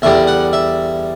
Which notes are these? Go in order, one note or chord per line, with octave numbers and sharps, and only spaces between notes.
E2 D3 G3 E5
F#5
E5